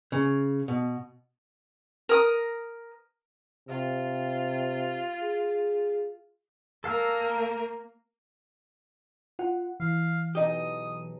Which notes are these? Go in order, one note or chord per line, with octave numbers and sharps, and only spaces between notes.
C#3
B2
A#4 D#6
C3 F4
G#4
A#3 A4 A#4 F5 E6
F4 F#5
E3 F5
B1 D#4 G4 D#6